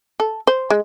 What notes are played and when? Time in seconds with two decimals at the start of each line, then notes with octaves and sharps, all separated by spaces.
0.20 A4
0.47 C5
0.70 G#3